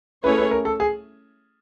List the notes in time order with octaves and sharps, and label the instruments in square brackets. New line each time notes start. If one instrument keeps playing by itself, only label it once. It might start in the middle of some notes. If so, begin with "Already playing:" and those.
[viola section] A3 C#4 E4 G#4 C#5 [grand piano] B4
[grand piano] B4
A#4
A4
G#4